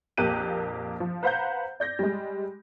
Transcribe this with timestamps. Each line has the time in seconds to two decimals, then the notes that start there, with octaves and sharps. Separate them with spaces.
0.17 A#1 F2 A#3 G4 F#6 D#7
1.00 F3
1.23 B4 C5 F5 F#5 A#5 G6
1.80 D5 G6 A#6
1.99 G3 G#3